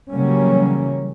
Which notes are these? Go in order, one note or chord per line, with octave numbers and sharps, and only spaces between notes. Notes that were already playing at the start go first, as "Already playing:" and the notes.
C#3 E3 F#3 G3 A#3 C#4